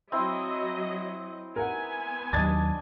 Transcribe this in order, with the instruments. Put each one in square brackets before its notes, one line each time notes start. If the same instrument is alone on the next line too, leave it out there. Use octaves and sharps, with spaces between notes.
[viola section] F#3 D#5 [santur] C4 E4 C6
[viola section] B3 G#5 [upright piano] A#4 F#5
[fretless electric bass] D#2 F#3 [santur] D4 D#5 [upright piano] G#6 A6